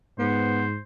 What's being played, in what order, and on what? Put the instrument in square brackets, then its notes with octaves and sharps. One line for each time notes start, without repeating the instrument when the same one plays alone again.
[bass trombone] G#2 [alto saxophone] B3 [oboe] C5